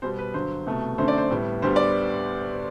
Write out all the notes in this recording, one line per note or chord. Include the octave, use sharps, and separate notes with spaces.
B2 G3 B3 C5
B4
G2 D3 F#3 C5
C2 B2 A3
F#2 D3 A3 C4 C5
D5
C5
A2 G3 B3
D2 D3 G3 B3 C5
D5